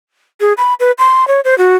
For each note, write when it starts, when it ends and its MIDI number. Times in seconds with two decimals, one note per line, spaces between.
0.41 0.53 68
0.58 0.74 83
0.80 0.92 71
0.98 1.27 84
1.28 1.40 73
1.45 1.57 72
1.58 1.77 66